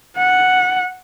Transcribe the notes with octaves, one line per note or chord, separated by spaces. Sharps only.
F#5